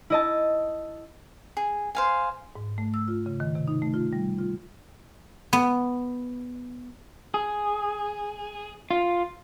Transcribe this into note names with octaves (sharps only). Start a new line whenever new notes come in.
E4 D#5 A5
G#4
C5 F5 G#5
G#2
A3
E6
F4
C#3
D#3
C3
D#4
A3
F4
G3
F4
B3
G#4
F4